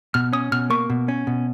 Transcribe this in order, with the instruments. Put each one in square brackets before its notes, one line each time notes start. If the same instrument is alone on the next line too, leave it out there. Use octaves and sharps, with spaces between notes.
[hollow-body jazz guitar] B2 [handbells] F6
[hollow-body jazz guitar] C#4 [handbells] D#6
[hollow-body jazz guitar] B2 [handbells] F6
[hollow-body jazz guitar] A#3 [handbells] C#6
[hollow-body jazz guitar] B2
C#4
B2